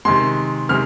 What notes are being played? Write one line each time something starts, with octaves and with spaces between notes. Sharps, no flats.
C3 D#3 G#3 C6
C3 D#3 G#3 F6